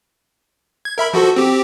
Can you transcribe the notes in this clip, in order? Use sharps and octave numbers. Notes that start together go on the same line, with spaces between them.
G#6
A#4 E5 B5
F3 F#4 A4
C4 G4